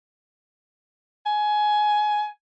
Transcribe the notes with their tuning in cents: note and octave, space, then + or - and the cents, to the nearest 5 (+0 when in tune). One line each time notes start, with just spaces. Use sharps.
G#5 +15